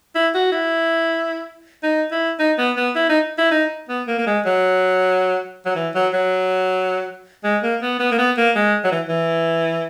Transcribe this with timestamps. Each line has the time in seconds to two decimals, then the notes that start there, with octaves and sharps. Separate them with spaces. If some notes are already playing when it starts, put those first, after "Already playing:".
0.15 E4
0.34 F#4
0.52 E4
1.83 D#4
2.11 E4
2.39 D#4
2.58 B3
2.76 B3
2.95 E4
3.09 D#4
3.38 E4
3.51 D#4
3.89 B3
4.07 A#3
4.18 A#3
4.26 G#3
4.46 F#3
5.66 F#3
5.75 E3
5.95 F#3
6.13 F#3
7.44 G#3
7.63 A#3
7.82 B3
7.99 B3
8.11 A#3
8.18 B3
8.37 A#3
8.56 G#3
8.84 F#3
8.92 E3
9.09 E3